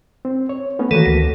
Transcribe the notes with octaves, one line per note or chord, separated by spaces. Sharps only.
C4
C#5
A3 B3 C#4
D#3 E3 A3 A#3 F#4 A4
D2